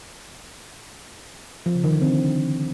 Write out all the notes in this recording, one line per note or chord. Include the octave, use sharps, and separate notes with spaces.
F3
C#3
D#3
D3
C4